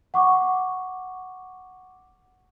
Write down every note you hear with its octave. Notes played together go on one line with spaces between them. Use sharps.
F#5 C#6 D6